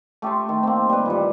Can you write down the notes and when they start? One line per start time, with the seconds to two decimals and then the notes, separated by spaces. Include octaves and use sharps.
0.22 A3 G4 A5 C6
0.49 D#3
0.63 A#3 C4
0.89 G3 B4
1.05 A#2 E3 G3